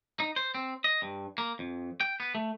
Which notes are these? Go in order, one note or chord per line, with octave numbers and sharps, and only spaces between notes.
D#4
C5
C4
D#5
G2
A#3
F2
G5
B3
A3